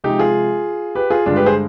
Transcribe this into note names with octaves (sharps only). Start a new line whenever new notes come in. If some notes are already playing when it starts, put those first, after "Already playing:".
C3 F3 G#3 D#4 G4
F4 G#4
G4 B4
F4 G#4
G2 D3 G#3 D4 F4
G4 B4
G#4 C5